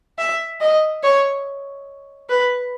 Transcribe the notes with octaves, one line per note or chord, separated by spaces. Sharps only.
E5
D#5
C#5
B4